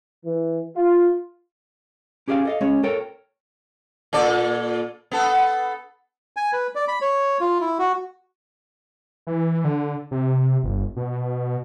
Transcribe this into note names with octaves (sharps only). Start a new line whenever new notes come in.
E3
F4
C#4 G4 G#4 C#5 F5 G5
A4 D#5 F5
G#3 C#4 G#4 C#5
A4 A#4 C#5 G5
A#2 A4 D5
B3 A4
G#5
B4
D5
B5
C#5
F4
E4
F#4
E3
D3
C3
G1
B2